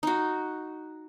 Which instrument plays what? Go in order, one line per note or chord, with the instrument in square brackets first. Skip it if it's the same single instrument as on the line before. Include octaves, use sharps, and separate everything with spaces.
[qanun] D#4 F#4